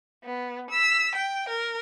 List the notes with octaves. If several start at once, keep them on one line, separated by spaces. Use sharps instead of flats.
B3
E6 B6
G5
A#4